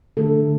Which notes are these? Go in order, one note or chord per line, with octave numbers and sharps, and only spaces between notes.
D3 A3 A4